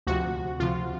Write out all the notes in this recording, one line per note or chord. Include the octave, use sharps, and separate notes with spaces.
D2 C3 F3 F#4
D2 C3 F3 F4